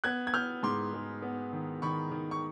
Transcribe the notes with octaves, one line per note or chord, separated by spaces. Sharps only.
B3 F#6 G#6
G#6
B3 F6 G6
G#2 C6 D6
G#3
B3
D#3
D#3 B5 C#6
D#3
C#6